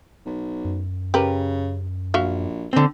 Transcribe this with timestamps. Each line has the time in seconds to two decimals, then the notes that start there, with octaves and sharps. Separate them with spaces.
0.26 B1
0.65 F#2
1.14 C#3 G4 A#4 B4
2.14 A#1 F#4 E5 F5
2.73 D3 C4